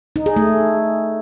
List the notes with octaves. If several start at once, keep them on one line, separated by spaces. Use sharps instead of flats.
D#4
G#4
A3